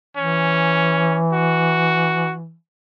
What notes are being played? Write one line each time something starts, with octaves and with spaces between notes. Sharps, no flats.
E3 C#4
F#4